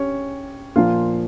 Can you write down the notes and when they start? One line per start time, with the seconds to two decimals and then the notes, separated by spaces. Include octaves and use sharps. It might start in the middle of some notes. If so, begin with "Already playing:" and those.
Already playing: C#4 G4 C#5
0.76 A#2 F3 A#3 F4 F5